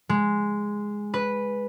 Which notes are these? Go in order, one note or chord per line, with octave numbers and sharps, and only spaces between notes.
G#3
B4